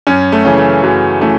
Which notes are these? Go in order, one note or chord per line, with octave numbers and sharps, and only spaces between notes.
F#2 C#4
A3
C#3 E3 C#4
A3
F#2 F#3
E3 A3 C#4